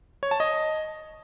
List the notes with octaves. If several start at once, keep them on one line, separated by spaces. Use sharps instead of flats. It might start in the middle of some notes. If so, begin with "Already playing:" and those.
C#5
A5
D#5